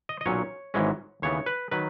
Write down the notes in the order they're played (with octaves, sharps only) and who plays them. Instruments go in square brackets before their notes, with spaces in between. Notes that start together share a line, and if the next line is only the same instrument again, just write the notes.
[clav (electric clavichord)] D#5
D#5
B1 A#2 F#3 C#4 C#5
G#1 G#2 E3 G#3 C#4
D#2 C#3 E3 B3 C#5
B4
D#3 F#3 B4